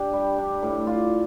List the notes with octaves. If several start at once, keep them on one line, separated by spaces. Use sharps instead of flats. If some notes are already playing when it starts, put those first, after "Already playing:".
Already playing: D4 G4
G3
D4
A2
F4